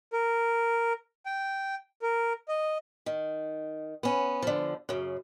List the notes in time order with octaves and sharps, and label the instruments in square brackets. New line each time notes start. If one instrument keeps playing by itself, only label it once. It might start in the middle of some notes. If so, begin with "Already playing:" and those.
[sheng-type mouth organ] A#4
G5
A#4
D#5
[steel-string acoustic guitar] D#3
B3 C#4
D3 F3
F#2 C#3